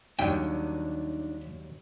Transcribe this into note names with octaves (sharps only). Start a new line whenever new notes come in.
D#2 D#3 F#3 G3 D4 G5